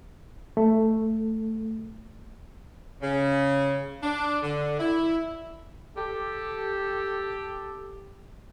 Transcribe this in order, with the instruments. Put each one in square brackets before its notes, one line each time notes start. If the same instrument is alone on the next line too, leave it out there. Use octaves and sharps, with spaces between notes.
[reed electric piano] A3
[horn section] C#3
D4
D3
E4
G4 A4